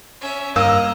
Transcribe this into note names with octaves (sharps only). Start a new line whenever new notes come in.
C#4 E5
G2 A#3 D#5 A#5 E6